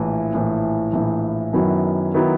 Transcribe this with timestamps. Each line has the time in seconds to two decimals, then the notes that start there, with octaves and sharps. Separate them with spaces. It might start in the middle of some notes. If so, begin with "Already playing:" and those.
Already playing: A#1 A2 E3
0.34 A#1 A2 E3
0.93 A#1 A2 E3
1.53 F#2 D#3 F#3 B3 E4
2.14 D#3 F#3 B3 E4